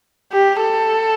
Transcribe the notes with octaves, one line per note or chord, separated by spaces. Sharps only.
G4
A4